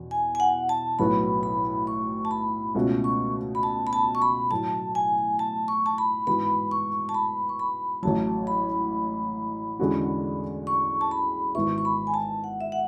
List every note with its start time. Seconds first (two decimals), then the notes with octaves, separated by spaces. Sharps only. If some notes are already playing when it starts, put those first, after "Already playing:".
Already playing: E2 B2
0.11 G#5
0.35 G#5
0.40 F#5
0.69 A5
0.99 B1 A2 F#3 B3 F#4 B5
1.43 B5
1.87 C#6
2.25 A5
2.31 B5
2.75 C#2 B2 A3 C#4 F#4
3.04 C#6
3.55 B5
3.63 A5
3.87 B5
3.93 A5
4.15 C#6
4.22 B5
4.51 A2 F#3 A3 A5
4.95 G#5
5.39 A5
5.68 C#6
5.86 A5
5.98 B5
6.27 G#2 E3 B3 F#4 B5
6.71 C#6
7.09 A5
7.14 B5
7.49 C#6
7.60 B5
8.03 A1 A2 F#3 A5
8.47 B5
9.79 E2 D3 G#3 C#4 F#4
10.67 C#6
11.01 A5
11.11 B5
11.55 G#1 G#2 E3 B3 E4 C#6
11.78 C#6
11.85 B5
12.07 G#5
12.14 A5
12.44 F#5
12.61 E5
12.72 F#5